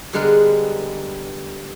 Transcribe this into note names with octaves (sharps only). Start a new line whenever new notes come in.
D3 G3 G#3 B3 A#4 B4